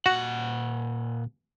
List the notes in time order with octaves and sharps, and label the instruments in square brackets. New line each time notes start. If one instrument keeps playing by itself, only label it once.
[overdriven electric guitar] A#2 F#5 [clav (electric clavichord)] F#4